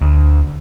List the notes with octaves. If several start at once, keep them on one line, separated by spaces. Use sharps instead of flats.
D2